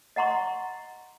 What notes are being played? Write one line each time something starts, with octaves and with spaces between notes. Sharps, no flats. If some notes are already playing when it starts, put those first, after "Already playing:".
D#5 F#5 A#5 C6 C#6